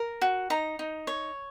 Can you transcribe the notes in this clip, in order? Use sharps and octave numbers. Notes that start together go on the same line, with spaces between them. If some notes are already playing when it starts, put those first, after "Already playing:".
Already playing: A#4
F#4
D#4 A#5
D#4
C#5